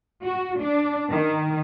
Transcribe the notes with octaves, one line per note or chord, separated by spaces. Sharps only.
F#4
D4
D#3